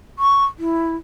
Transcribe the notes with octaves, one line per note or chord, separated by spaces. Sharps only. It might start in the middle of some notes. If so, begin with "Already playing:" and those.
C#6
E4